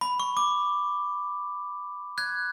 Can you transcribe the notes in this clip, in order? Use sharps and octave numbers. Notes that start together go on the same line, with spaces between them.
B5
C#6
D6
F#6 G#6